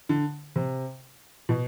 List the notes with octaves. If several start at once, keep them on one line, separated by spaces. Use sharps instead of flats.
D3
C3
B2